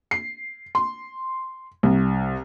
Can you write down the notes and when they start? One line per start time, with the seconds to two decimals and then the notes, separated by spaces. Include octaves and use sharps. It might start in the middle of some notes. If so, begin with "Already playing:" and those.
0.11 C7
0.75 C6
1.83 C2